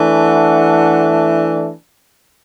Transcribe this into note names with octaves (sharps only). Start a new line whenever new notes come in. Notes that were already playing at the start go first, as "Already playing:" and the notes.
Already playing: E3 A3 D4
F#5